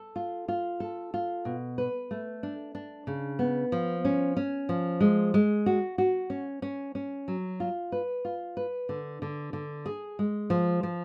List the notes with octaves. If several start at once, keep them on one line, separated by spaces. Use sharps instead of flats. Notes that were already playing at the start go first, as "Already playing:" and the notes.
Already playing: A4
F4
F4
A4
F4
B2
B4
A3
D4
D4
C#3
B3
F3
C#4
C#4
F3
G#3
G#3
F#4
F#4
C#4
C#4
C#4
F#3
F4
B4
F4
B4
D3
D3
D3
G#4
G#3
F3
F3